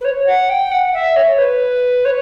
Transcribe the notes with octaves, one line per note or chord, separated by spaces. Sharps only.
B4
C#5
F#5
G5
F#5
E5
C#5
B4
C#5